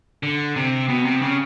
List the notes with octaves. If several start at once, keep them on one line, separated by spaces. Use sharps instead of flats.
D3
C3
B2
C3
C#3